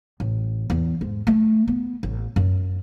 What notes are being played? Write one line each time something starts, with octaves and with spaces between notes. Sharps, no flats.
A1
E2
G#2
A3
B3
A1
F#2